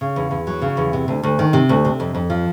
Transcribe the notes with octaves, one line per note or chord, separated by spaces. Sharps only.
C#3
E2
E2
F#3
C#3
E2
C3
D2
D2
D#3
C3
D2
C3
F2
F2
F3